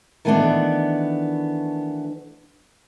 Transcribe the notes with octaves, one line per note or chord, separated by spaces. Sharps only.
D#3 E3 A3 B3 D4